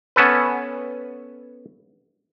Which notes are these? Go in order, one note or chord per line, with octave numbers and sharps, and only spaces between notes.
B3 C#4 A4 B4